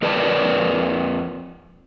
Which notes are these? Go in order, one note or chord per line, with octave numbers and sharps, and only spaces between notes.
F2 A#4 B4 D5 A5